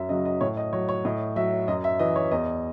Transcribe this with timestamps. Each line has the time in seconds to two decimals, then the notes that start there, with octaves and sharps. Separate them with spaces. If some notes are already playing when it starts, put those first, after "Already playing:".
Already playing: F#2 E5
0.09 C#3 F#3 D#5
0.25 D#5
0.41 A2 C#5
0.57 D#5
0.73 F#3 C#5
0.89 C#5
1.05 A2 D#5
1.36 F#3 E5
1.68 F#2 D#5
1.84 E5
1.99 E3 D#5
2.16 C#5
2.31 E2 D#5